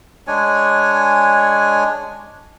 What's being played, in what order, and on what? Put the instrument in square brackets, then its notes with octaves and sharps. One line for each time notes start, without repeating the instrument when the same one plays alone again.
[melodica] G#3 D4 C#5 G#5